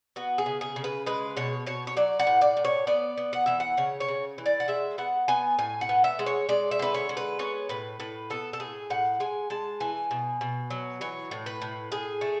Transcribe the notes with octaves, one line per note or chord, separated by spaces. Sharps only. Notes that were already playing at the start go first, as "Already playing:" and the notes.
B3 F#4
G#4
C#3
G#4
C#3
B4
G#3 B4
B2 C#5
B2 C#5
C#5
F#3 D5
F#5
A2
D5
A2
C#5
B3 D5
B3
F#5
E3 E5
F#5
C#3 C#5
C#5
C#3
E3
D5
F#5
G#3 E5
B3 F#5
B3 G#5
A2 G#5
F#5
B3
E5
G#3
C#5
G#3 D5
E5
D3 B4
C#5
G#3
B4
B3 C#5
A2 B4
A2 B4
B3 A4
A4
A2 G#4
A2 F#5
G#3 G#5
G#3 A5
E3 G#5
B2
B2
F#3
E3 C#5
A2
B4
A2
A2 G#4
A3